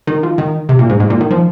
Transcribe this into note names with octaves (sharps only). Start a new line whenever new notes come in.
D#3
F3
D#3
C3
A#2
G#2
G#2
A#2
D#3
F3